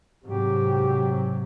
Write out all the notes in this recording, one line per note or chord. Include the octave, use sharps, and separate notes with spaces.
G#2 C3 F#3 G4